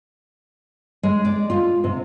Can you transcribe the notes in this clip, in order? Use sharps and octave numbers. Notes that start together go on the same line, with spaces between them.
G#3
D5
F4
C3